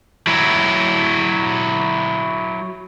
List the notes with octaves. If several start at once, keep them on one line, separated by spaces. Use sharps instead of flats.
F#3 E4